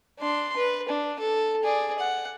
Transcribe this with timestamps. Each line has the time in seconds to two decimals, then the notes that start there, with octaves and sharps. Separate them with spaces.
0.19 D4 C6
0.56 B4
0.89 D4
1.20 A4
1.64 G#4 D5
1.99 F#5